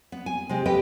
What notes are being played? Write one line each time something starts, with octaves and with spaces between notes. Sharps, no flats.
B3
G#5
C3 G#3 G4
G4 A4 B4 D#5 G5